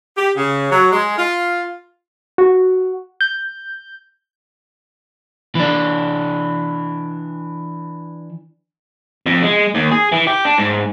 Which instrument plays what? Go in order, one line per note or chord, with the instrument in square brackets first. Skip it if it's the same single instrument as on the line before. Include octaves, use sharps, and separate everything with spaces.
[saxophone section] G4
C#3
F#3
G#3
F4
[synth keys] F#4
G6
[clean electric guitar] E3 D4
[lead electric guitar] F2
G#3
D#2
G#4
E3
G4
D4
G#2